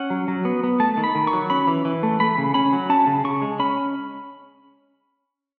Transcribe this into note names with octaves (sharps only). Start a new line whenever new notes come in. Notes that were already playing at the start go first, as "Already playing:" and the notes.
Already playing: C#4 F#5
F#3
F#3
B3
B3
A3 A5
D#3
B5
D#3
C#6
F#3
C#4 B5
E3
E3
A3
A3 B5
C#3
C#4 B5
F#3
C#4 A5
C#3
C#3 C#6
G#3
C#4 B5